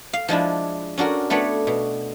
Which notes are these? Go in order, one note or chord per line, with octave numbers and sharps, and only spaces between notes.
F5
F3 G#3 D4 E4
C#4 D4 F#4 A#4
A3 B3 D4 C#5 B5
B2